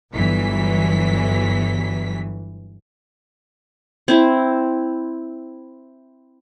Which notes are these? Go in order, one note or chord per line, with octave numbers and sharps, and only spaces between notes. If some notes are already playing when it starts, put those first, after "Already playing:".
G1 E3 F#3 B6
C4 E4